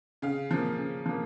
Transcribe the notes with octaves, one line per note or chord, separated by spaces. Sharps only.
C#3 F5
F3 A#3
C#3
F3 A#3